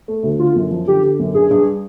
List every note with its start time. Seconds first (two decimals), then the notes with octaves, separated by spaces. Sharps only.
0.08 A3
0.23 D2
0.39 D3 F4
0.56 F#2
0.71 F3
0.87 D3 G4
1.03 D3
1.19 F#2
1.34 G2 G#4
1.51 G2